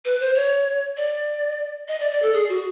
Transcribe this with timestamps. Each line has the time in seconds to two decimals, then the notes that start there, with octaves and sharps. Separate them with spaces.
0.05 B4
0.20 C5
0.35 C#5
0.97 D5
1.88 D#5
2.00 D5
2.11 D5
2.22 A4
2.34 G#4
2.49 F#4